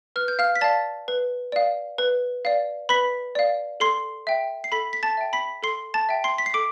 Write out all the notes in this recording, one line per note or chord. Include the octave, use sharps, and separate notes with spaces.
B4 F6
G6
F5 F6
B6
D5 F5 A5 A6
B4
D5 F5
B4
D5 F5
B4 B5 B6
D5 F5
A4 C6 C7
E5 G5
C7
A4 B5 B6
B6
A5 A6
E5 G5
B5 B6
A4 C6 C7
A5 A6
E5 G5
C6 C7
B6
C7
A4 D6 D7